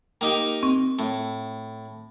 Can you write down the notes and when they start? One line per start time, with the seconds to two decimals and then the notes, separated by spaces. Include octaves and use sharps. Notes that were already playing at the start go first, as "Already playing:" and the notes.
0.21 A#3 D#4 G4 G5
0.63 C4 C#6
0.99 A2